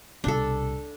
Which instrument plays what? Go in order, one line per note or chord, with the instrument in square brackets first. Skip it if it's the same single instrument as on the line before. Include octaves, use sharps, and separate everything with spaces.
[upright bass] C2 B2 [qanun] D4 A4